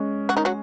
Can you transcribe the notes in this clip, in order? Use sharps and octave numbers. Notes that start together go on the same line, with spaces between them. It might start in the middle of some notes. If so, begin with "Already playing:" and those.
Already playing: G#3 C#4
F#3 F#4
D#3 D#4
F#3 F#4